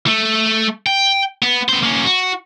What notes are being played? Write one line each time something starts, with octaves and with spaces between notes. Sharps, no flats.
A3
G5
B3
B3 C5
A#3 C#4
F#4